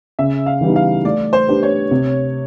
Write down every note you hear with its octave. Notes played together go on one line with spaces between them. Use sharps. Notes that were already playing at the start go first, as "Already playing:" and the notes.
C#3 E5
F5
E3 G3 B3 D#4
F5
A3 D5
C5
D4 G4 B4
C#5
C3